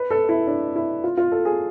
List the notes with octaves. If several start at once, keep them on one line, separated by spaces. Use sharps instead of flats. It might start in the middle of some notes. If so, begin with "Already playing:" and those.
Already playing: B4
A4
E4
D4
E4
F4
F4
A4
G#4